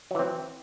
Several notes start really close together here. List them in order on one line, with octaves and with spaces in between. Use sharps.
F#3 E3 C4